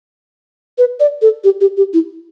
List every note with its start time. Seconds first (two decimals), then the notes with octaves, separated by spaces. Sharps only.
0.78 B4
1.00 D5
1.22 A4
1.44 G4
1.61 G4
1.77 G4
1.93 E4